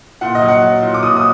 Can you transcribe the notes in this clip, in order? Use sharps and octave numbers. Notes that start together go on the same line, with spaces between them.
A#2 F#5
D#5
F#3
F#5
F#3
A#2
D6
A#2 D#6
D#6